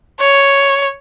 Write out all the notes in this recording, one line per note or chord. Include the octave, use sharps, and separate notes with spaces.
C#5